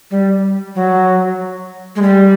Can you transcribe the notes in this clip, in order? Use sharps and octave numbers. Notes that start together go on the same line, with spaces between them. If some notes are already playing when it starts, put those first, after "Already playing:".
G3
F#3
G#3
G3